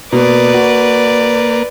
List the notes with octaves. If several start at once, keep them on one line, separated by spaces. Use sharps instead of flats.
B2 A#3 B4 D5
F#4